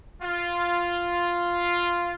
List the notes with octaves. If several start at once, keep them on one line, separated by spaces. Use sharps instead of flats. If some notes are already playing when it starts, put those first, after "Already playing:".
F4